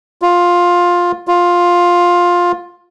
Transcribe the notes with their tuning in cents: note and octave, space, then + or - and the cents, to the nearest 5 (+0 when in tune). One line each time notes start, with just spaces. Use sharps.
F4 +10
F4 +10